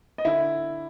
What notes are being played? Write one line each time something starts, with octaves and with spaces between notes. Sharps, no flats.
D#5
D3 E4 E5